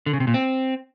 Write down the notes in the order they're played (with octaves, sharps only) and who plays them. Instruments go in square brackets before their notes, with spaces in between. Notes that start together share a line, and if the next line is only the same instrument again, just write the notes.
[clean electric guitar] D3
C#3
C3
A#2
C4